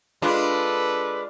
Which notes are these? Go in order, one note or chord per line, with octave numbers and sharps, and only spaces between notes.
G#3 D4 F4 A4 B4 B5 C6